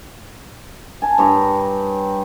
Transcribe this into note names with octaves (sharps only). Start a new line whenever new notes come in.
G#5 A5
G2 G4 C#5 A#5